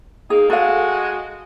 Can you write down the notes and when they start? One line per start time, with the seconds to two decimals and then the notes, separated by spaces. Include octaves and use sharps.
0.30 A#3 D#4 G#4
0.50 G#3 F#4 A4 F5